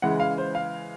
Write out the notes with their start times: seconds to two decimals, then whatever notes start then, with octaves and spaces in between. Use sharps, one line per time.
0.02 C#3 E3 G#3 F#5
0.20 F5
0.38 C5
0.55 F5